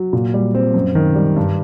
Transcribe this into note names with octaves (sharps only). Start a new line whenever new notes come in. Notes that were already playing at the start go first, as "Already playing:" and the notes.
Already playing: F#3
A#2
G3
C4
F#2
D#3
G3
G2